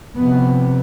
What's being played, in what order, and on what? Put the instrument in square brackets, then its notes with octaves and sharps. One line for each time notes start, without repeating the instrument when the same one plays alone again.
[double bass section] F2 C3 B3